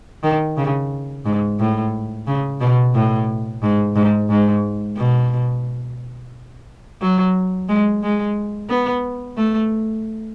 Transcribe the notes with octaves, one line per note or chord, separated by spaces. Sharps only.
D#3
C#3
G#2
A2
C#3
B2
A2
G#2
G#2
G#2
B2
F#3
G#3
G#3
B3
A3